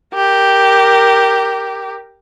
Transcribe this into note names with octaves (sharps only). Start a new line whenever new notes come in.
G4 A#4